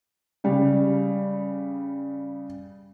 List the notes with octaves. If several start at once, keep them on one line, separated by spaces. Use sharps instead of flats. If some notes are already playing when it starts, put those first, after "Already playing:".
C#3 G3